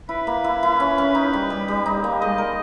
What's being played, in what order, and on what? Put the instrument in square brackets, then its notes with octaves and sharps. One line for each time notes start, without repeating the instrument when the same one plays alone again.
[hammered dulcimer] E4 [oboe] B4
[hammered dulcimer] A#3
E4
E4
C#4
C#4
D#4
G3
G3
G3
D#4
A#3
[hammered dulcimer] G#3 [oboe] D#5
[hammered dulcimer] A#4